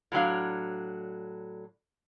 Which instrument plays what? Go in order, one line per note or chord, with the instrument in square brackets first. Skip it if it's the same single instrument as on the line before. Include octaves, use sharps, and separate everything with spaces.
[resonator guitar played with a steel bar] A2 F#3 D4 F5